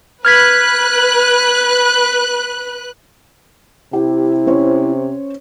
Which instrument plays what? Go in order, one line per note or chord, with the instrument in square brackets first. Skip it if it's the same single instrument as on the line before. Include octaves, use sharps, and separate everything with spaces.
[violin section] B4 F#6 [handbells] F6 G#6 B6
[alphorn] C3 [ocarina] E4 [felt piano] G4
[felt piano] C#4 C5 C#5